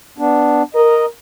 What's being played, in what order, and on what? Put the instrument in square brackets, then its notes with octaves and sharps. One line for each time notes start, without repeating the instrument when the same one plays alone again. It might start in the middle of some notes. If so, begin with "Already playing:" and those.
[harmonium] B3 D4
[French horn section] A#4 [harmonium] D#5